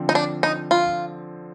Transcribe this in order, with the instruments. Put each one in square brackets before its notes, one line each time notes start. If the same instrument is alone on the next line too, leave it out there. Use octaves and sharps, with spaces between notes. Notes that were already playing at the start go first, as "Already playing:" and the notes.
Already playing: [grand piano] D3 F3 C4
[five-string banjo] D#4
D4
D#4
F4